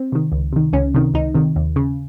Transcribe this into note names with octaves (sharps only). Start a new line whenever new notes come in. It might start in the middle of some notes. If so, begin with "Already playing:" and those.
Already playing: C4
C3 D#3
C#2
C3 D#3
C#2 C#4
C3 D#3
C#2 D#4
C3 D#3
D#2
C#3